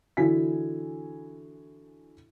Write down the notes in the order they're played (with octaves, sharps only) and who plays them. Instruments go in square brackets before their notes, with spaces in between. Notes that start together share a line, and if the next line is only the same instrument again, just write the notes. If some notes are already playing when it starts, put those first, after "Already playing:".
[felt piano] D3 E3 E4 F#4 G#5 B6